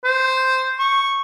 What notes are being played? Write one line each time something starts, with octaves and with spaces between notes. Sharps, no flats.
C5
C#6